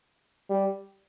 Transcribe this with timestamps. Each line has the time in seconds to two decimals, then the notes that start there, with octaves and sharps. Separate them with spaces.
0.50 G3